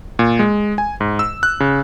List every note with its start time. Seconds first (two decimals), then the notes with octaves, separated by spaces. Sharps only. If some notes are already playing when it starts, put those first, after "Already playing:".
0.19 A#2
0.39 G#3
0.78 G#5
1.00 G#2
1.19 E6
1.43 F#6
1.60 C#3